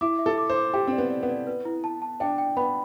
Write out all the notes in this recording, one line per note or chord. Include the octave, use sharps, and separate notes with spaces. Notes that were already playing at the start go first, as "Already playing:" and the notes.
E4 D6
E5
A4
D6
C5
D6
G4 G5
C4 D5
B3
D5
B3
D5
B4
E4
A5
A5
D4 G5
G5
B3 B5